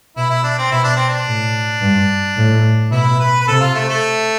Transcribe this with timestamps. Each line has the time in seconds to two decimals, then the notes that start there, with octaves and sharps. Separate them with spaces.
0.17 B2 E4
0.30 E4
0.44 D4
0.58 C4
0.71 B2 E4
0.84 D4
0.96 C4
1.08 D4
1.27 A2
1.81 G2
2.37 A2
2.91 B2 E4
3.19 B4
3.41 B4
3.47 C3 A4
3.60 F4
3.75 A3
3.88 A3